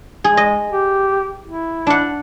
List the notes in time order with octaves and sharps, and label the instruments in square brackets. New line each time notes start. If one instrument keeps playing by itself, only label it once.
[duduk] G#3 [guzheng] G#4
[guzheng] D#5
[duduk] G4
E4
[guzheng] D4 F#5